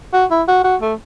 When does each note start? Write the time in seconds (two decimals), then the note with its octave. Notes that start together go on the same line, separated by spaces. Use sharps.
0.13 F#4
0.31 E4
0.48 F#4
0.64 F#4
0.82 A3